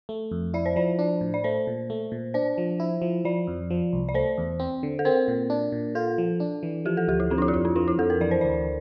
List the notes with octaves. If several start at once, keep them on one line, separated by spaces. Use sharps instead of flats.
A3
F2
E4 D5
C5
F3 D5
D4
A2
D5
A3 C5
A#2
A3
A#2
D4 C5
F3
E4
F3
F3 D5
F2
F3
C2
D5
A3 C5
E2
C4
D3
A4
C4 A#4
A#2
D4
A#2
F4 A4
F3
D4
E3
F3 G4
A4
D2 G4
E4
F3 C4
D4
E4
F4
F2 E4
C4
F3 D4
E4
F2 A4
A#4
E3 D5
C5
D2 D5